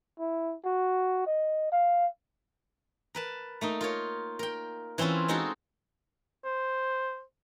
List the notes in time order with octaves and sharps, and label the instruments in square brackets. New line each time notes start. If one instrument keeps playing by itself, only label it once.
[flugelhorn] E4
F#4
D#5
F5
[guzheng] A#4 B4 A5
A3 A#3 D#4
F4 A#4 C#5
A#4 G5
E3 C4 C#4 E4 F4
G#3 C4 D#4 F#4 G#4 A4
[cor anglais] C5